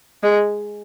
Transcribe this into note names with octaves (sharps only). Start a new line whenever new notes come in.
G#3